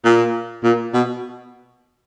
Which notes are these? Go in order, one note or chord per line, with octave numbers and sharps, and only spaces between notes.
A#2
A#2
B2